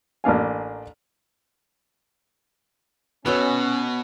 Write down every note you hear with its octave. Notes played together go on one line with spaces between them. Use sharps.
A1 A#3 D4 F5 G#5
B2 B3 C#4 F#4 A4 B4 C#5